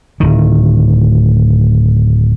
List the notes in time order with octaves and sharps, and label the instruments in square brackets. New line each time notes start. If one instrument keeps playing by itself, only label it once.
[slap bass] D1 D#3